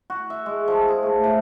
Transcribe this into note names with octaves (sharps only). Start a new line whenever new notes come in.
F#4
E5
G#3
F3
G#4
A3
A2